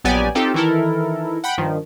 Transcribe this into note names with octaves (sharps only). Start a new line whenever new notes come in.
A#1 F#3 B3 G4 D5 G#5
C4 D#4 F4 G4 A4
D#3 E3 E4 A4 A#4
F#5 G5 B5
G2 D#3 F3